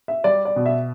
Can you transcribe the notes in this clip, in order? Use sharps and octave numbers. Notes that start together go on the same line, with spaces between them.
E5
G3 D5
D5
B2
E5